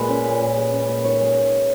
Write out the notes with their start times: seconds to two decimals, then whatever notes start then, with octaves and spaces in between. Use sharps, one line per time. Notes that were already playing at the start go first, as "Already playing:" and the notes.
Already playing: A#2 G#3 B4
0.09 C#4
0.26 A#2
0.41 A#2
0.57 G#3
0.73 C#4
0.89 A#2
1.04 D#3 C#5
1.21 G#3